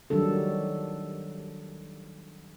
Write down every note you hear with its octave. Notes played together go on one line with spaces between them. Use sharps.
D#3 F#3 G3 D4 A4